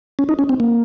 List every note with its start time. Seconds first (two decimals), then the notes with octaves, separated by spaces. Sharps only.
0.19 C#4
0.29 D#4
0.39 C#4
0.49 C4
0.60 A#3